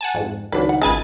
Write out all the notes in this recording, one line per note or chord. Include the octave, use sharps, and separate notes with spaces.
F#5 G#5 A5
F2 G#2
C#2 D#3 F#3 D4 B4
F#5
G#1 C#2 G#3 G#5 A5 B5 A6